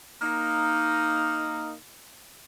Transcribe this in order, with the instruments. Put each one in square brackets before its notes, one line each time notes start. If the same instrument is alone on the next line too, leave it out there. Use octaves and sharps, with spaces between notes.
[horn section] A#3 D#4